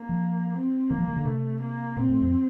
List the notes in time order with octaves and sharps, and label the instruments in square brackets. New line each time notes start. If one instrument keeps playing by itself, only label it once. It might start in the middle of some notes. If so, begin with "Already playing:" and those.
Already playing: [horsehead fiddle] A#3
[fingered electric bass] F3
[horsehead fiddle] C4
[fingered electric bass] D#3 [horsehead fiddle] A#3
[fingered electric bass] F3
D#3
D3
[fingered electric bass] C3 [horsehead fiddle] A3
[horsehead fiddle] A#3
[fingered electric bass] A#2 [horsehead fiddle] C4
[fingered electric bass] A2
F2